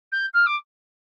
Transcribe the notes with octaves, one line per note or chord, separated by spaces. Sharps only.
G6
F6
D6